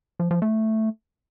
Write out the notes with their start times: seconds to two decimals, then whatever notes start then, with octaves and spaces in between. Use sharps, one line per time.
0.19 F3
0.31 F3
0.42 A3